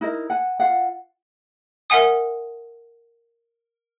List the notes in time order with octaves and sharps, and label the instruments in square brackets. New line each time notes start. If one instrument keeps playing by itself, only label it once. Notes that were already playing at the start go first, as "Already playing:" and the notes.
[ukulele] D#4 E4 A#4 D#5
F#5 G#5
F4 F5 F#5
[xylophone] A#4 E5 F#5 G#5 D#6